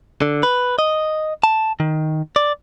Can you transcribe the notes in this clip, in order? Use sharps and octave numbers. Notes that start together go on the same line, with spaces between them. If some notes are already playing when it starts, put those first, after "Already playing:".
D3
B4
D#5
A5
D#3
D5